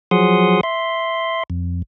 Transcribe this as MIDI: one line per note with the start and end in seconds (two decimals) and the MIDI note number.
0.11 0.61 53
0.11 0.61 54
0.11 0.61 68
0.11 0.61 78
0.11 0.61 84
0.11 0.61 87
0.63 1.43 76
0.63 1.43 84
1.50 1.82 41